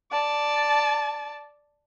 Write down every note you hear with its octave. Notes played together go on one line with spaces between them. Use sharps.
D5 A5